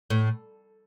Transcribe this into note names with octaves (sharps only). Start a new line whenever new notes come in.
A2